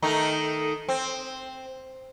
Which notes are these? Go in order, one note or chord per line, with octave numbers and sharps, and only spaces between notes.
D#3 A3 D#4
C4